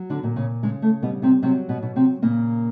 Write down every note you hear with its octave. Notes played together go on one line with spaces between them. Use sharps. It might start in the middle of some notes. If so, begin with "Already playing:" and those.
Already playing: F#3
D3 D4
A#2
C#3 C#4
C#3 G#3
A3
B2 G3 B3
C3 C4
C3 F#3 C4
B2 B3
B2
C3 C4
A#2 C#3 A#3